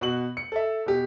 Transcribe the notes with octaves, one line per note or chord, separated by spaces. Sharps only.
B2 F#4 F#7
C#7
A4 E5
B2 G4